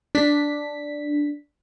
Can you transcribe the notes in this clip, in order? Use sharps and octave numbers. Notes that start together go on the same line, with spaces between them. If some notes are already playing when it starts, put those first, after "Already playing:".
D4 B6